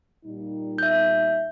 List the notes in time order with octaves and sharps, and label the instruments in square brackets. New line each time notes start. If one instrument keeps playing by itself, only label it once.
[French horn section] A#2 G3 D#4
[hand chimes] E5 G6